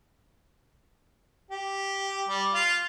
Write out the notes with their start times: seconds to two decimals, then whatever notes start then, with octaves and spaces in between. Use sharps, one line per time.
1.51 G4
2.29 G3
2.54 F4 F5